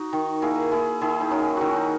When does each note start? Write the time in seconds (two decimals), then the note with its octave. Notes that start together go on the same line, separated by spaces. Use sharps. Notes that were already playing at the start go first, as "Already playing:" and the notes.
Already playing: D#4 F#4
0.13 D#3
0.42 A#3 E4 G#4
0.72 A#3 E4 G#4
1.01 D#3 E4 G#4
1.21 D#4
1.31 F#3 C#4 E4
1.57 D#3 C#4 E4 F#4
1.76 D#4